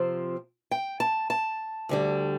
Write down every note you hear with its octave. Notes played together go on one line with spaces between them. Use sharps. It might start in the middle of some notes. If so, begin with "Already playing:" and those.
Already playing: C3 F3 C4
G5
A5
A5
D2 D3 G3